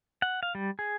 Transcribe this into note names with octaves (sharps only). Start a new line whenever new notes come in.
F#5
F5
G3
G#4